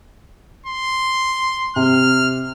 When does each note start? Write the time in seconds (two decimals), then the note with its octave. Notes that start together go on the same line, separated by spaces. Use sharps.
0.66 C6
1.76 C3 F6